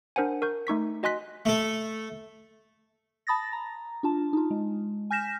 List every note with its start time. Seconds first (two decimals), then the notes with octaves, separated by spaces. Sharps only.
0.16 D4 A#4 C5 F#5 G#5
0.42 A#4 C#6 G6
0.67 A3 D#4 C#6 B6
1.03 F#4 D#5 G#5 C6 F#6 B6
1.45 A3 A4
3.27 A5 B5 D#6 A6 A#6
3.53 A#5
4.03 D4 F4 A5
4.33 D#4 F4
4.51 G#3
5.10 G#5 F6 G6 A#6 B6 E7